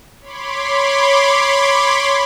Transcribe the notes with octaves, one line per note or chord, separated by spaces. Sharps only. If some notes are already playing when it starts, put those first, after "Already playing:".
C#5 B5 C6 D6